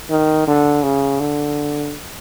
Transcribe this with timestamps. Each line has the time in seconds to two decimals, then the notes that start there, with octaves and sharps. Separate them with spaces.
0.10 D#3
0.47 D3
0.83 C#3
1.20 D3